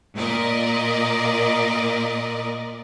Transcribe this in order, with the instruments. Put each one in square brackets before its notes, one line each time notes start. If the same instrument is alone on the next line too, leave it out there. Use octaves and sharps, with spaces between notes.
[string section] A#2 A#4 D5 D#5